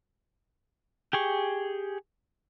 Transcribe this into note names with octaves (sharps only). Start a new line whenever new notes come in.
G4 G#4 C#6